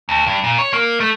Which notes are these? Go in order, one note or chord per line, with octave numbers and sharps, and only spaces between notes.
D2
G2
A#2
C#5
A#3
A3